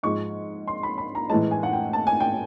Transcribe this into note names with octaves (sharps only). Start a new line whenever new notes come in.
G#2 F3 G#3 C#6
C6
B5
B5
A#5
A2 E3 G#3 A5
G#5
F#5
G5
A5
G#5
G5